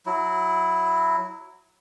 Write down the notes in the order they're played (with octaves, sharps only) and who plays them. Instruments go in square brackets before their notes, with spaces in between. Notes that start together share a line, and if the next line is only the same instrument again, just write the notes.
[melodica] F#3 E4